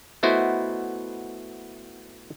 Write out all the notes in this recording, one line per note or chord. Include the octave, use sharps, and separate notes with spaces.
A3 B3 E4 F#4 C5 D#5